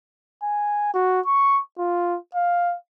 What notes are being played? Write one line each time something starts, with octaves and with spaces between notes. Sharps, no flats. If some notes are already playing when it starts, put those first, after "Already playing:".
G#5
F#4
C#6
F4
F5